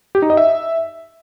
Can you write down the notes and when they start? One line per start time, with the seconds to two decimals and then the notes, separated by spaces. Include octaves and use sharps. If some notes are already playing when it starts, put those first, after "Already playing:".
0.15 G4
0.22 D#4
0.30 D#5
0.37 E5